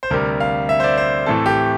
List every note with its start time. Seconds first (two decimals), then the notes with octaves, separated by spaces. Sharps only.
0.03 C5
0.11 D2 C3 G3 A#4
0.40 F5
0.69 E5
0.80 C5
0.84 D5
0.97 C5
1.26 A2 E3 A3 C4 A4
1.46 G4